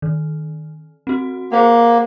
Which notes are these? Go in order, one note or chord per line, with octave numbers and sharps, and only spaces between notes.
D#3
C4 F#4
A#3 G#4 C5 F#5